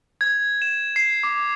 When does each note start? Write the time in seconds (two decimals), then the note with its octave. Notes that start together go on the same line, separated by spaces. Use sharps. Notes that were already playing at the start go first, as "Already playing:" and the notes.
0.21 G#6
0.62 E7
0.96 C7
1.23 D6